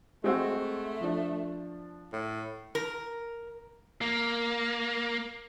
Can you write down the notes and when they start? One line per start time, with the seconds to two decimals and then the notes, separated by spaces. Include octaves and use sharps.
0.24 G#3 A3 C4 F#4
1.01 F3 D4
2.13 A2
2.75 A#4
4.01 A#3